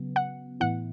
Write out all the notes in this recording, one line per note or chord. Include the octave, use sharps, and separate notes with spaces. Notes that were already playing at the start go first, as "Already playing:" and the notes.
Already playing: C#3 F#3 B3
F#5
A2 E3 B3 E4 F#5